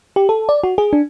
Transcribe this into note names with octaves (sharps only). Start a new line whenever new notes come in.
G4
A4
D5
F#4
G#4
D4